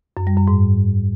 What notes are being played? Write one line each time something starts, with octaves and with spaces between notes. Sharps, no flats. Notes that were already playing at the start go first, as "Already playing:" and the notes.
F#2
G3
F#2
G#2